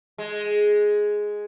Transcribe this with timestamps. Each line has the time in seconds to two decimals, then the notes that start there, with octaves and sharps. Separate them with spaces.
0.18 G#3